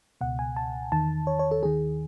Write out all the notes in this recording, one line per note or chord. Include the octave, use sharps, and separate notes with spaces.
C#2 B2 F#5
G#5
A5
E2 D#3 A5
C#5
C#5
A4
D#2 D#3 G#4